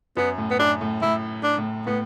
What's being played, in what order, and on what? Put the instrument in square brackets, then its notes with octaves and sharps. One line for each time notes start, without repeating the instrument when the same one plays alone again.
[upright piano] F#2 [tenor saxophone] B3
[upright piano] A2
[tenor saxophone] B3
[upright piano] F#2 [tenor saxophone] D4
[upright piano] A2
[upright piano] A2 [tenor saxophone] E4
[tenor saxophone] D4
[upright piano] A2
[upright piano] A2 [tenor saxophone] B3